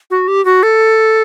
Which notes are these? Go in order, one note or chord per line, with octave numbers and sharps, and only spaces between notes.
F#4
G4
F#4
A4